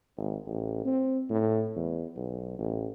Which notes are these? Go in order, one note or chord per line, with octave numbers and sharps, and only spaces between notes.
G#1
A1
C4
A2
E2
B1
A1